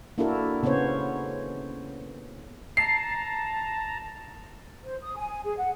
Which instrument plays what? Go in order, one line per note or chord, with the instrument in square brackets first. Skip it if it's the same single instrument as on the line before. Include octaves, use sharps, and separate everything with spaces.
[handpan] A#3 D4 E4 F#4 A4 A#4
C#3 B3 C#4 C5 C#5
[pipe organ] A5 A#5 [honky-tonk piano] C7
[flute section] C5
D#6
G#5
G#4
F#5